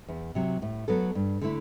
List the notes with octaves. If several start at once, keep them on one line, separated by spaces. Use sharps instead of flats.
E2
C3 F#3
A2
F#3 B3 F#4 A4
G2
D3 A3 E4